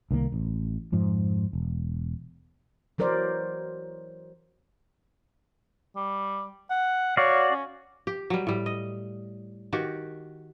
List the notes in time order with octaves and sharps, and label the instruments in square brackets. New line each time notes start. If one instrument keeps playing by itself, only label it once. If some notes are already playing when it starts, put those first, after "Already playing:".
[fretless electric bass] C2 D#3 E3 A#3
A1
F2 G#2 F3
E1
[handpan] E3 F#3 A#4 C5 D5
[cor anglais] G3
F#5
[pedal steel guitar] F#4 D5 F5 [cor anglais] C#5
[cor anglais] C#4
[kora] G4
F#3 G3
A2 G3
D#5
D#3 F#4 G4